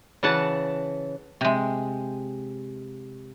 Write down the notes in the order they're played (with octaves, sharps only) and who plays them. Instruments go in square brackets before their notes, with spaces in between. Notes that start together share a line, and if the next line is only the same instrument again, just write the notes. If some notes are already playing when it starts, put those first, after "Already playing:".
[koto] C#3 E3 F#5 A5
[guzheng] C3 G#3